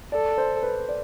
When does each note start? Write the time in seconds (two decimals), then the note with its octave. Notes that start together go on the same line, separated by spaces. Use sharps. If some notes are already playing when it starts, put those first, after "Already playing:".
0.12 A4 D5
0.38 C5
0.63 B4
0.89 D5